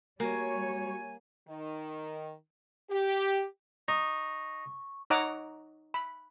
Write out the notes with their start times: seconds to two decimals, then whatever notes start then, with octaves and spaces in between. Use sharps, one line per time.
0.20 G3 A#3 F#4 C#5 G#5
1.48 D#3
2.90 G4
3.88 D#4 C#6
5.10 D#4 C#5 D#5 F#5 A#5 D6
5.94 B5